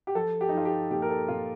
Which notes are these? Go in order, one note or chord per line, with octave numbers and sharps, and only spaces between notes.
G4
F3 A4
G4
D#4
F3 F4
G4
A#2 G4
A#4
A4
A#2 F4